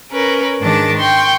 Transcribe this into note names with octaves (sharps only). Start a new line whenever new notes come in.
C#4 A#4 B4
G#2 D#3 D4 G#4 A5 D6
G5 C6 C#6